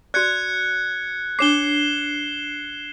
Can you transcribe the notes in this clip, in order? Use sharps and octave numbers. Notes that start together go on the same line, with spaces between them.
F#4 D5 F#6 G#6 C#7
D4 C#5 D6 C7 E7 G7